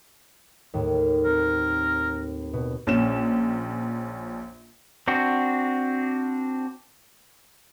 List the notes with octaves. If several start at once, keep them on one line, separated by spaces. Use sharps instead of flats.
D#2 A2
C4 A#4
B2
A#1 C#4 E7
C4 D4 F#4